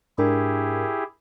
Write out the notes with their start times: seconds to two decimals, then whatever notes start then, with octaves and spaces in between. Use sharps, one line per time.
0.18 G#2 D4 E4 G4 G#4 A#4